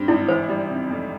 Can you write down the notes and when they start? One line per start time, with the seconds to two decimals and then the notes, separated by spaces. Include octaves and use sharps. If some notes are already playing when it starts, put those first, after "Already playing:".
Already playing: G2 G3 C4
0.08 G#1 E4
0.28 E3 C5
0.49 G3
0.70 C3
0.91 F2